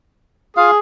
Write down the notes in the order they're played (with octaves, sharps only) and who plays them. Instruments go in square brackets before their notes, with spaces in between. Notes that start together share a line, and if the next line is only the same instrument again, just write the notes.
[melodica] F4 F5 [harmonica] G#4 D#6